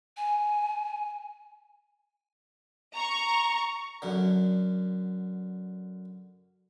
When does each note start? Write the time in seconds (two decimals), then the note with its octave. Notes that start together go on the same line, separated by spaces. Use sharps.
0.17 G#5
2.95 A#5 C#6
4.02 F#2 D3